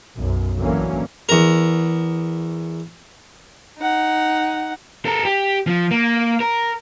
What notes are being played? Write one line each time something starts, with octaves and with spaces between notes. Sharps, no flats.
B1 F#2
A1 D3 E3 F#3 A#3 C#4
E2 A#4
D#4 F#5
A4 A#4
G4
F3
A#3
A#4